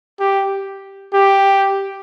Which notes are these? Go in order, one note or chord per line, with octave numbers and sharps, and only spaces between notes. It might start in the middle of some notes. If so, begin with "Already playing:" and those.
G4
G4